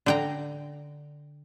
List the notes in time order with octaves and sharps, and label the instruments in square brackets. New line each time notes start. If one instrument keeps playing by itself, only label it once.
[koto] D3 G5 A#5